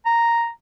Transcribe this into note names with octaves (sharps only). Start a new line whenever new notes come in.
A#5